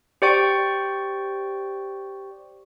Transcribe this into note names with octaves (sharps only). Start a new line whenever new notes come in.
G4 C5 D5 G5 C#6